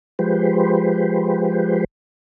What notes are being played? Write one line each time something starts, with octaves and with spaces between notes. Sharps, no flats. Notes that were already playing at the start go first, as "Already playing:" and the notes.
F3 G#3 G4 B4 C5